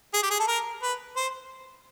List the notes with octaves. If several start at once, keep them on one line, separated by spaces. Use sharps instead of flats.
G#4
G4
G#4
A4
A#4
B4
C5